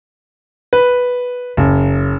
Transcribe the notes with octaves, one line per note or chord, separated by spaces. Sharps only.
B4
F#1